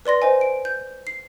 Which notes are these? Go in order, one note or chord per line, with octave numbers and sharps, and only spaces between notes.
B4 D5 C6 A#6
C5 D#5 G#5
D7
G6
C7